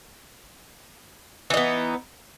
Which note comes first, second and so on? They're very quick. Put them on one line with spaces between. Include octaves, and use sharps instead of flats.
E3 D#4 B3